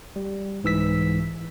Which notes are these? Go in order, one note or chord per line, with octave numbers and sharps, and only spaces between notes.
G3
C2 G#2 E3 E6 B6